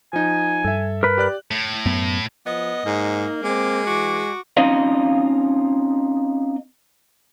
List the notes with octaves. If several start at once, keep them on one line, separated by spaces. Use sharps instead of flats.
F3 D#4 G#5
G2 A4 E5
A#4 B4
G4 D5 F#6
A2
F#2 B3
F3 B3 D#5
G#2 A#3 D#4
G#3 C4 D6
E3 F#4 D6
C4 C#4 D#4 F4 D#5 F5